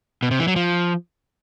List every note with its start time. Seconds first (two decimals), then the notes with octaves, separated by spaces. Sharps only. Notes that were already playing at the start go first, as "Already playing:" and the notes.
0.23 B2
0.31 C3
0.39 E3
0.48 F#3
0.56 F3